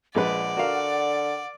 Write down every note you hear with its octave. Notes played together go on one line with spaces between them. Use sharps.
A#1 G#3 B4 D5 F#5
D3 F#4 A#4 F5